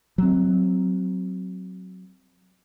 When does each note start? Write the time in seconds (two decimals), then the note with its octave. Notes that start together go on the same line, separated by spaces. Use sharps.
0.18 F#3 C4